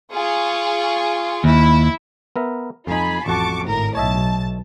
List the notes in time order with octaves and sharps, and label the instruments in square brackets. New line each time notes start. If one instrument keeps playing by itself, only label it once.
[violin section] F4 G#4 C#6
[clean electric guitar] D#2 [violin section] E4
[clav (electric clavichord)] B3 A#4 E5
[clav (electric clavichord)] F2 D#4 [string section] F4 G#5 B5
[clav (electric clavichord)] A1 F2 F#4 [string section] A5 C#6 D6
[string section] G#1 A2 A#4
[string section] B1 A5 [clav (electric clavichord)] C#5 D#5 E5